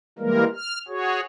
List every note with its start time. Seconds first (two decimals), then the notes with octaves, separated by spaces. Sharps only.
0.19 E3 G3 G#3 A#3 A#4
0.55 F6
0.88 F#4 G#4 C#5